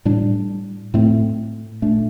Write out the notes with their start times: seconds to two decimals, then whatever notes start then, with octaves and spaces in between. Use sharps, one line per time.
0.05 A2 G3 D4
0.94 A2 A3 C4
1.82 A#2 A3 D4